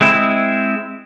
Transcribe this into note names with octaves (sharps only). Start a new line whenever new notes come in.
G#3 C4 E4